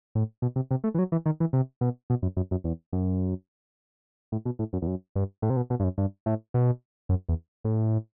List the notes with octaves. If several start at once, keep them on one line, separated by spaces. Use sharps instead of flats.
A2
B2
C3
C3
A3
E3
F#3
E3
D#3
E3
C3
B2
B2
F#2
F#2
F#2
E2
F#2
A2
B2
A2
F#2
E2
F#2
G2
A2
C3
B2
B2
G2
F#2
G2
A2
B2
F#2
E2
A2